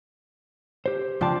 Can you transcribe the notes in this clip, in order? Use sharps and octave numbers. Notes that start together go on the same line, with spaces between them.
G4 C5
C#2 F3 C4 D4 A5